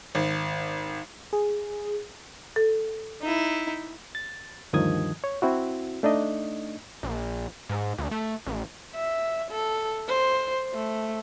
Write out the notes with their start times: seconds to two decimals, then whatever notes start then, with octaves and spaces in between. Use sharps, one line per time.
0.15 G#1
1.33 G#4
2.56 A4
3.22 D#4 E4
4.15 A6
4.73 D2 G2 D#3 F3 D#6 G#6
5.24 C#5
5.42 C4 E4 F#4
6.03 A3 D4 D#4 D#5
7.03 A#1
7.69 G#2
7.98 D2
8.11 A3
8.47 A1
8.95 E5
9.51 A4
10.08 C5
10.74 A3